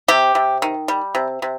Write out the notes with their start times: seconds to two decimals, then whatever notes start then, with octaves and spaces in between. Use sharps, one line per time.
0.08 C3 G4
0.35 C3
0.62 D#3
0.88 G3
1.15 C3
1.42 C3